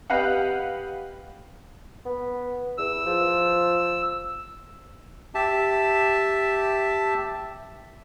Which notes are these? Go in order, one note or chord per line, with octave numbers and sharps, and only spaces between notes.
G4 B4 D#5 F5 F#5
B3
E2 E6
F3
G4 E5 A5